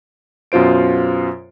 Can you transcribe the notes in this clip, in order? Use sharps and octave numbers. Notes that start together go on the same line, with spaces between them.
F#2 B2 F4 C5 D7